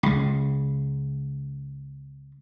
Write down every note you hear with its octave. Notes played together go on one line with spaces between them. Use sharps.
C#2 C#3